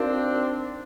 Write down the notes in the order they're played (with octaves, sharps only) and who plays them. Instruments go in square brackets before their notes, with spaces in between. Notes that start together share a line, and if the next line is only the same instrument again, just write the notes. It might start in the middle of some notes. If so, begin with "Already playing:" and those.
Already playing: [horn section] C4 D4 [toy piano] D#4 F#4 A#4 D5 F5